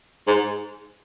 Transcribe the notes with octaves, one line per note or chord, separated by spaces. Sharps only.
G#2